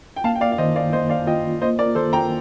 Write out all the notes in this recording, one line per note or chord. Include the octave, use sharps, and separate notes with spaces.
G5
A#3 F5 A5
G5
D5 F5
F5
D#3 C5 D#5
D5 F5
A#3 C5 D#5
D5 F5
F4 D#5 G5
A#3 C5 D#5
A#4 D5
D#3 A4 C5
G5 A#5